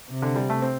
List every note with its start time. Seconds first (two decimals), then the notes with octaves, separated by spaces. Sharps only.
0.10 C3
0.22 D3
0.36 G3
0.50 A3
0.62 C4